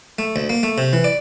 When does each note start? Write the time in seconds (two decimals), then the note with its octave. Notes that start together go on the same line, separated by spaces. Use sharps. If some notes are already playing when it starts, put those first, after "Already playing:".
0.19 A3
0.36 D2
0.50 A#3
0.63 A3
0.78 C3
0.93 E3
1.04 D5